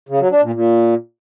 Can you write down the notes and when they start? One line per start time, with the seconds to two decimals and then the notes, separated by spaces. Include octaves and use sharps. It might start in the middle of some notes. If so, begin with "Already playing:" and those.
0.09 C#3
0.20 F#3
0.31 D4
0.42 A#2
0.54 A#2